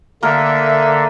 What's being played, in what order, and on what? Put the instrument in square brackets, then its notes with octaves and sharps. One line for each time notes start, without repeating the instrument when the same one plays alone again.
[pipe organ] D3 [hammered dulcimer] A#3 A#4 [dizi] E5